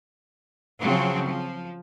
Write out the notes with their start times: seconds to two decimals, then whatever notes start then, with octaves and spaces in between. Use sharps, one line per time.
0.81 C#3 F3 F#3 C4
1.26 F3